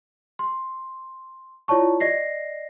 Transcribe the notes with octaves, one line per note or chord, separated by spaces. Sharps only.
C6
E4 F4 C#5 D5 A5 C#6
D5 D#5 A#6 C7